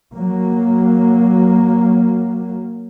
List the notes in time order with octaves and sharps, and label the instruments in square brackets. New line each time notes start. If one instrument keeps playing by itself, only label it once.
[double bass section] F#3 A#3